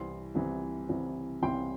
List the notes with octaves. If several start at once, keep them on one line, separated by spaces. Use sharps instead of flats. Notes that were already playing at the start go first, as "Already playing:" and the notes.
Already playing: C2 C3 E3 C6
C2 C3 E3
C2 C3 E3
C2 C3 E3 G5 C6